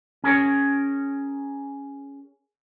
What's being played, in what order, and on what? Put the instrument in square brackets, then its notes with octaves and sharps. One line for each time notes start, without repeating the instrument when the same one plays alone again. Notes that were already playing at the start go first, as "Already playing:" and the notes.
[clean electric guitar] C#4 G#4 A#4 C#5